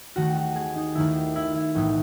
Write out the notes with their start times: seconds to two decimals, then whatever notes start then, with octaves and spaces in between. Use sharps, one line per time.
0.16 D#2 D#3 A3 F#4
0.37 F#4
0.56 G#4
0.75 D#4
0.95 D#2 D#3 A3 E4
1.36 E4
1.55 E4
1.75 B1 A2 E3 D#4